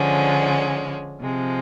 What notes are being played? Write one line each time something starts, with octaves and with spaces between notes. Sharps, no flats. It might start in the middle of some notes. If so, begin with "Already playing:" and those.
Already playing: D3 F3 G#3 C#4
C3 F3 G#3